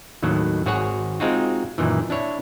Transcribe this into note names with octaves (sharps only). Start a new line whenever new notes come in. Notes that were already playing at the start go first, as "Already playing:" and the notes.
D#2 A2 D#3 F#3
G#1 F#4 G#4 C#5 F#5
G#3 C4 D#4 F4 F#4
F#2 A#2 D#3 E3
D4 E4 C#5